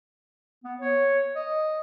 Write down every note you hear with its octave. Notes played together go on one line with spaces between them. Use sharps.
B3
C#5
D#5